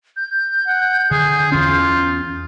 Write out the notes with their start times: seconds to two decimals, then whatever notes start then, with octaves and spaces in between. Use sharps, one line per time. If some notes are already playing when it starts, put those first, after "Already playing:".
0.17 G6
0.67 F#5
1.11 D3 G#4
1.52 E2 C#4 F4